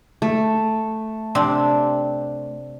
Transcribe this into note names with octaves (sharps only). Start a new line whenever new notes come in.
A3
C3 C4 D4